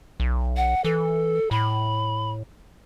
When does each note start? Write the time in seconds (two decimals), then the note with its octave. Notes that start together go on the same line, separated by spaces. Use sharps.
0.20 B1
0.57 F#5
0.84 E3 A4
1.51 A2 B5